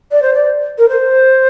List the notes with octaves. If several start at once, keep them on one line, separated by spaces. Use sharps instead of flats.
D5
C5
D5
A#4
C5